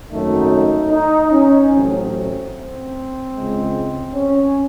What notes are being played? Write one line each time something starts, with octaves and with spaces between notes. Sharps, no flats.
G#1 F#2 D#3 F#3 A3 D#4
D#4
C#4
A1 A2 F#3 A3 C4
C4
C#2 C#3 G#3
C#4